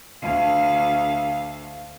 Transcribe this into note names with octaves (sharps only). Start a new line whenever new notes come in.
D2 F5